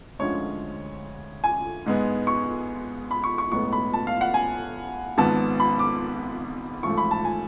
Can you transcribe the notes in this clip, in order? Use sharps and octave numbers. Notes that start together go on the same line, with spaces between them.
D2 D3 F3 G#3 C#4 C#5
G#5
G#2 G#3 B3
C#6
B5
C#6
C#6
B1 A2 G#3 B3 C#6
B5
A5
F5
F#5
G#5
G#1 G#2 F3 B3 A5
B5
D6
A1 G#2 F3 A3 C#6
B5
A5
G#5